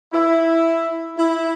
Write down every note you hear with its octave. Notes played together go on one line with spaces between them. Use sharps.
E4
E4